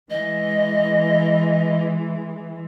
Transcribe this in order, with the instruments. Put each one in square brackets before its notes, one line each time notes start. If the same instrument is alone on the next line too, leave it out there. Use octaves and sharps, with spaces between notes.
[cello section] E3 G#3 [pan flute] D#5